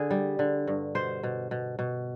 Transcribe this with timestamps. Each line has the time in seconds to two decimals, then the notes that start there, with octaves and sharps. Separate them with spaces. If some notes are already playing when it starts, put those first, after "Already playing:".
Already playing: D3 G#4
0.11 G3
0.39 D3
0.68 G2
0.95 B2 C5
1.23 B2
1.51 B2
1.79 B2